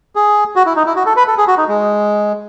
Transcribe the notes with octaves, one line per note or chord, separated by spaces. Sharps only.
G#4
F#4
E4
D#4
E4
F#4
A4
B4
A4
G#4
F#4
D#4
G#3